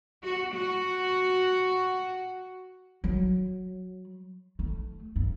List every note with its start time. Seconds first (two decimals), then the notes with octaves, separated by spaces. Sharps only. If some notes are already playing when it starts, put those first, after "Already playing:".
0.23 F#4
0.54 F#4
3.04 F#3
4.59 A3
5.16 G2